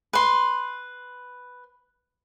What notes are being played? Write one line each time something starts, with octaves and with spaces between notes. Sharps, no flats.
B4 C6